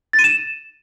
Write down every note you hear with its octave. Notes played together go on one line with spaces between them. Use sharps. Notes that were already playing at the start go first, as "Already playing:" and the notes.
A6
D#7
E7